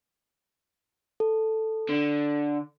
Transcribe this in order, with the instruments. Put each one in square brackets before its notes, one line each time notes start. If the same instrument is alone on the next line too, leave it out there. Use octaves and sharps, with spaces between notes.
[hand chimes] A4
[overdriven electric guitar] D3